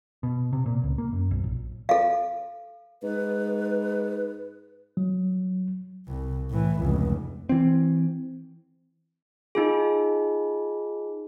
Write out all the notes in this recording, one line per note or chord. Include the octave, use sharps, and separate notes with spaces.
B2
C3
A#2
C#2
A#3
F#2
B1
A#1
A4 F5
G#2 B4
F#3
C2
A2 E3
F1 C#2
E3 C4
D#4 F4 G#4